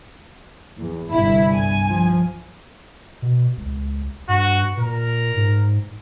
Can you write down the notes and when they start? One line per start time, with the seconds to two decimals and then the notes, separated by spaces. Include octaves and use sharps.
0.78 E2
1.12 G1 C2 G2 E4
1.55 G#5
1.89 F3
3.22 B2
3.58 C#2
4.29 G2 F#4
4.77 A#2 A#4
5.36 G#2